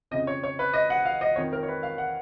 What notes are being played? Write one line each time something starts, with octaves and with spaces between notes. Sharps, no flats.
F2 C#3 D#5
C#5
C#5
B4
D#5
F#5
F5
D#5
F2 D#3 C#5
A#4
C#5
B4
F5
F#5